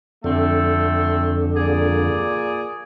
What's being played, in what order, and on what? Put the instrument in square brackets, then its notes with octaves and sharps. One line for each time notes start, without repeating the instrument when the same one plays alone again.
[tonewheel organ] F2 D3 [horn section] A3 C4 A4
[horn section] A#2 G#4 D5